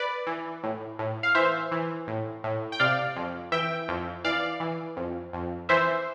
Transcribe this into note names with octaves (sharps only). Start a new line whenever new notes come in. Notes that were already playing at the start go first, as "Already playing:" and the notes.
Already playing: B4 D5
E3
A2
A2
F5
E3 C5 E5
E3
A2
A2
G5
C3 D5 F5
F2
E3 E5 G5
F2
E3 D5 F5
E3
F2
F2
E3 C5 E5